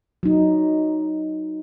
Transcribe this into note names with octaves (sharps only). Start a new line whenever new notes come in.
F#3 D#4